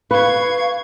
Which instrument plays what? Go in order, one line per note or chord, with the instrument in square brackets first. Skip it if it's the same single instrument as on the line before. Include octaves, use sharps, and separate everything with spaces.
[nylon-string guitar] B4 [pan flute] F5 [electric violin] C#6 G#6